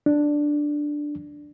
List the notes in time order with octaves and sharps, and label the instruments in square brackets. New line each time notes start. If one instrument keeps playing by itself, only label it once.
[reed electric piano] D4